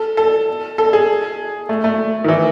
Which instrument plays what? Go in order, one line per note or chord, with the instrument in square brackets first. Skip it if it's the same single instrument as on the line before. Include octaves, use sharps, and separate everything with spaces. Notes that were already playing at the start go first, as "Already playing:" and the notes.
Already playing: [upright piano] A4
A4
A4
G#4
A3
A3
D#3
E3